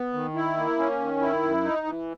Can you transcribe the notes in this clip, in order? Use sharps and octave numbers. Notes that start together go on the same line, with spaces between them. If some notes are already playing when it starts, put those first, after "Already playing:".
Already playing: B3
D#3
E4
A#3
C#4
D#3
E4
F#2
D#4
E3